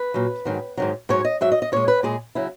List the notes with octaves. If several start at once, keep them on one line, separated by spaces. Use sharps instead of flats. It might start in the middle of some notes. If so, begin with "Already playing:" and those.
Already playing: B4
A#2 F#3
G#2 D#3 F#3
G#2 D#3 F#3
G#2 F#3 C#5
D#5
G#2 F#3 E5
D#5
D#5
A#2 G#3 C#5
B4
A#2 G#3 G#4
C#3 F#3 E4